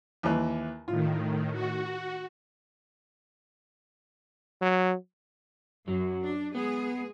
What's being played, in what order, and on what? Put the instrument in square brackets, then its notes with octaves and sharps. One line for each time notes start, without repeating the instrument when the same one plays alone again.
[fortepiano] D#2 E3
[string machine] A2 D#3 [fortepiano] F4
[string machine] F#4
[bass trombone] F#3
[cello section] F#2 [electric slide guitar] F#3
[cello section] D4
[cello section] G#3 G#4 [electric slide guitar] B3